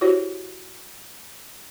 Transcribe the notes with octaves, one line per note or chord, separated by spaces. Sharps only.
E4 F#4 G4 C5 C#5